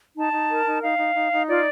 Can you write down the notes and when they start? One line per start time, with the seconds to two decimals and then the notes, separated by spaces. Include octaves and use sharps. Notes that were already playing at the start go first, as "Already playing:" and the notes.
0.17 D#4 A5
0.33 D#4
0.49 A#4
0.66 D#4
0.82 D#4 F5
0.99 D#4
1.15 D#4
1.32 D#4
1.47 F4 D5